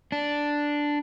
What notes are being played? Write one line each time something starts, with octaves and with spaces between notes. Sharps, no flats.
D4